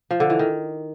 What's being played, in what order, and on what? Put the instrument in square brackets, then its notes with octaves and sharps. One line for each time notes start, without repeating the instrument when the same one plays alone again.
[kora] F3
D3
E3
D#3